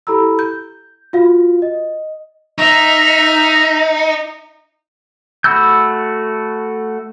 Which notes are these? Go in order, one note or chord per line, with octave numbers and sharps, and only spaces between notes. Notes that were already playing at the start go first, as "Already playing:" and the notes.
E4 G4 A4 A#5 B5 E6
G6
F4 F#4 F5
D#5
D#4 E5 F6
A3 F#4 B5 E6 G6